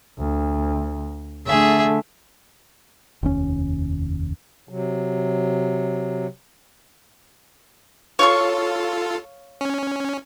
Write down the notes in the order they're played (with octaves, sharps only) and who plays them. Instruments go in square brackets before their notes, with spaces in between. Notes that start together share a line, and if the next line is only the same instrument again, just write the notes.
[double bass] D2
[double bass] D3 A3 [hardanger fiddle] G#4 E5
[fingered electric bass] F1 D#2 C#4
[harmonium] C3 F#3
[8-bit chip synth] F4 A4 [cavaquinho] C#5 F5 C#6
[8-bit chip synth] C#4